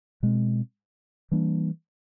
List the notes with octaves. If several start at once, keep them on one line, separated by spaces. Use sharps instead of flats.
B2 G#3 C4
E3 G3 A#3 D4